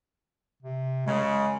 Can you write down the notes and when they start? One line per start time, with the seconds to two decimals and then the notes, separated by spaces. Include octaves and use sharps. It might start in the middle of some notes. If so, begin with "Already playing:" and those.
0.63 C3
1.06 F#2 C#3 G#3